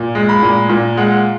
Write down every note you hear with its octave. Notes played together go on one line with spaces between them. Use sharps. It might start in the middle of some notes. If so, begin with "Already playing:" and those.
Already playing: A#2
G#3
B5
A#2
A#2
G#3 F#5